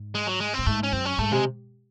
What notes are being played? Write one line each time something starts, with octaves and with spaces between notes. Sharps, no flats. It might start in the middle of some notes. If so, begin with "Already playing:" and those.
Already playing: G#2
G#3
F#3
G#3
A2 C4
G#2 A3
C#4
F#2 C4
C#4
G#2 A3
C3 G#3